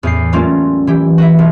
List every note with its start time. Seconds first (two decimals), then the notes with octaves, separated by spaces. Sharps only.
0.03 E2 A2 C7
0.33 F#3 G3 A3 A#3 C#4 F4
0.87 E3 G4
1.18 F#4 B4 E5
1.39 B1